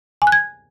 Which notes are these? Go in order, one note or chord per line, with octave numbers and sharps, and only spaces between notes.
G#5
F#6
G#6